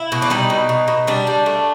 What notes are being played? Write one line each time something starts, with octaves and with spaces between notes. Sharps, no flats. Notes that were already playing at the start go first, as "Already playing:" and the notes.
Already playing: E4
B2
D4
G3 D#4
B2
B2
B2
G3 D4
G3
A3